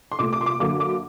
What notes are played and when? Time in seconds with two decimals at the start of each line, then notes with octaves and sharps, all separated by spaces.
0.12 C6
0.19 C2 A#2 A3 D6
0.33 D6
0.41 C6
0.46 D6
0.60 F#2 D3 F#3 A#3 D6
0.80 D6